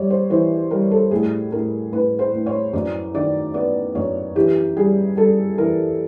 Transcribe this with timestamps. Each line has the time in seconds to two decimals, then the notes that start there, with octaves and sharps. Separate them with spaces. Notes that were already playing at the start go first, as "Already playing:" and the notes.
Already playing: G3 C#5 D5
0.10 C5
0.30 E3 C5
0.71 G3 A#4
0.91 A4
1.11 A2 G#4
1.51 A2 A#4
1.92 A2 B4
2.19 C5
2.33 A2
2.46 C#5
2.73 F#2 D5
3.14 D#3 D5
3.54 B3 D5
3.95 F#2 C#5
4.36 E3 G4
4.77 G3 G#4
5.16 G3 A4
5.58 E3 A#4